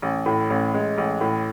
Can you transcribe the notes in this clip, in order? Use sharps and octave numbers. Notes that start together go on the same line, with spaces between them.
A1
A2
A1
G#3
A1
A2